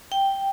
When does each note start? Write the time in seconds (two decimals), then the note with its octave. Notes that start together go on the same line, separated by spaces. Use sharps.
0.12 G5